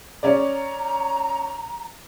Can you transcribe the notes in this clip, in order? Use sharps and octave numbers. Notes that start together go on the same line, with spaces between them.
C#4 D5 A#5